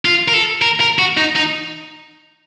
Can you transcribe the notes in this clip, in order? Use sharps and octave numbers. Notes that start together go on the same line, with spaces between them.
F4
A#4
A4
A#4
A#4
F#4
D#4
D#4